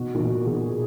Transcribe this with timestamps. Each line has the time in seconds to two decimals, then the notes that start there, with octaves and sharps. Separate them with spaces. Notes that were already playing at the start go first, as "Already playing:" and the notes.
Already playing: B2 F#4
0.15 A#2
0.20 B2
0.47 B2 G#4